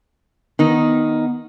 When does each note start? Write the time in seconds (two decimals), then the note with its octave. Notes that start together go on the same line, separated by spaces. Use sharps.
0.59 D#3 B3 D#4